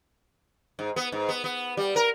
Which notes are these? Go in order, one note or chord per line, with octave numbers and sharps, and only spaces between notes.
G#2
B3
G#2
B3
B3
G3
A#4